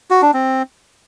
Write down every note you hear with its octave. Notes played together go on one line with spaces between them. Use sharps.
F#4
D4
C4